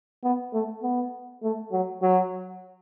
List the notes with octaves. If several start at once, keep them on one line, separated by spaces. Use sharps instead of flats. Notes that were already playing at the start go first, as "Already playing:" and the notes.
B3
A3
B3
A3
F#3
F#3